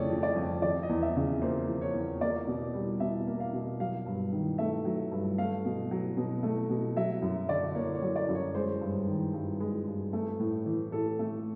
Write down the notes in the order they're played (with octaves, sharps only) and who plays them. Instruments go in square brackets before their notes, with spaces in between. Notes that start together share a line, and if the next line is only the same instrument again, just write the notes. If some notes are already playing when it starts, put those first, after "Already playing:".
Already playing: [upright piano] F2 C#3 F3 A3 C#5 D5
F3
D5
F2
F3 D5
D#5
E2
E5
C#3
A#3 C5
F3
C#5
E2
A#3 D5
B2
G3
B2 E5
A#3
F5
B2
F#3 F5
G2
D#3
A3 E5
F#3
G2
A3 F5
B2
F#3
B2
A3
B2
F#3 E5
F#2
D3 D5
A#3 C#5
C#5
F#3
D5
F#2
C#5
G#3 C5
G2
D#3
G2
G#3
G2
A3
A2
E3
A2 A4
A3